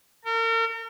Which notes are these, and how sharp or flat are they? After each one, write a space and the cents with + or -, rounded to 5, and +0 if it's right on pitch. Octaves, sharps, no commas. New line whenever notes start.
A#4 -40